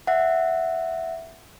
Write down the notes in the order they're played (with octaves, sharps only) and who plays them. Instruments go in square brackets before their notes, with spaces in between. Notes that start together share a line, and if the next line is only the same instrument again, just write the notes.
[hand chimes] E5 F#5